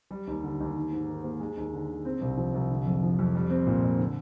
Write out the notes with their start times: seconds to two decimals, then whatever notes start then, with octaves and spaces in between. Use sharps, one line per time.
0.11 G3
0.27 D#2
0.44 D3
0.60 D#2
0.75 D#3
0.93 G#2
1.08 D#3
1.24 A#3
1.40 G#3
1.57 D#2
1.73 D3
1.89 D3
2.05 C4
2.21 C2
2.37 F3
2.54 C2
2.70 D3
2.87 F2
3.03 F3
3.19 F2
3.35 G3
3.50 C4
3.67 A#2
3.83 A#2
3.98 D3